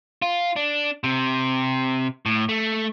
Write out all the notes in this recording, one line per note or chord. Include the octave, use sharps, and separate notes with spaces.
F4
D4
C3
A2
A3